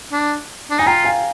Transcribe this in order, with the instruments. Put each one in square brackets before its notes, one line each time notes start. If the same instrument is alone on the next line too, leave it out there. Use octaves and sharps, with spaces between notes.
[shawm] D4
D4
[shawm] D#4 [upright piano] G#5
[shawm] F4 [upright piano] G5 A#5
[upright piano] F5 G#5